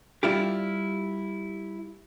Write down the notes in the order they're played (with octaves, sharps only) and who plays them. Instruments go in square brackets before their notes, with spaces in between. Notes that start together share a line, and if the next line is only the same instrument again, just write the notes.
[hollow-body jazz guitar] G3 E4 F4 G4